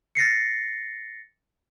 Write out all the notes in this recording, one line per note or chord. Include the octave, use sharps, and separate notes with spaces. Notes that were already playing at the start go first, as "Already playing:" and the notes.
A6 A#6 C7 C#7